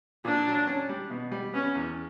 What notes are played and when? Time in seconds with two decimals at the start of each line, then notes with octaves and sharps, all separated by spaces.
0.25 A#2 D4
0.47 F#3
0.67 C#4
0.89 G3
1.10 B2
1.32 G3
1.53 B3 C#4
1.75 E2